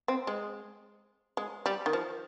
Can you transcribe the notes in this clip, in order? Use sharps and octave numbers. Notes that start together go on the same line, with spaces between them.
C4
G#3
G#3
G3
D#3
F3